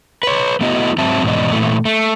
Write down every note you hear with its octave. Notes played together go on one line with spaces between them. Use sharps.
B4 C#5
A3 B3 E4 F#4 D#5
G#2 F#3 C4 E5 A5
E2 G#2 B2 D5 D#5
A#2 E3 A3
A3